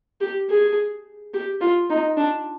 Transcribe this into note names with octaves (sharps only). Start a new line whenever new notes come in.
G4
G#4
G4
F4
D#4
D4